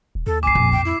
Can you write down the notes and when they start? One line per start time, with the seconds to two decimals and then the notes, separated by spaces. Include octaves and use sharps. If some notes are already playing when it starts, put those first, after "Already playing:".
0.15 D#1
0.27 D#2 A4
0.43 F#1 C#2 G#5 D6 C7
0.55 A#1 F2
0.72 A2 G5
0.85 E4